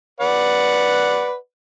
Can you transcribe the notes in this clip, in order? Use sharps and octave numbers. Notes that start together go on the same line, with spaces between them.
B4 D5 F#5